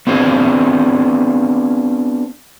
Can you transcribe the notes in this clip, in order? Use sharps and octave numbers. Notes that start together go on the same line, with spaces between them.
B3 C4 D4 F4 G#4 C5